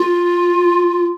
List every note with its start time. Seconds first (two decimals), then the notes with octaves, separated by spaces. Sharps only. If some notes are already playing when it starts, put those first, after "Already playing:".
Already playing: F4